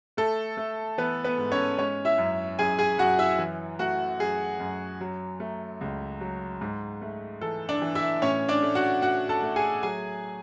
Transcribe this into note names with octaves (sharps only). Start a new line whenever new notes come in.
A3 A4
A3
E3 B3 B4
B3 B4
G#2
C#4 C#5
G#3 C#4 C#5
E4 E5
F#2
F#2 G#4 G#5
G#4 G#5
F#2 F#4 F#5
E4 E5
E3
A3 F#4 F#5
F#2 G#4
F#2
F#3
A3
C#2
F#3
G#2
A3
E3 A4
D4 D5
E3
E4 E5
A2 C#4 C#5
D4 D5
A3
F#4 F#5
A2 F#4 F#5
A4 A5
A3
G#4 G#5
F#3 G#4 G#5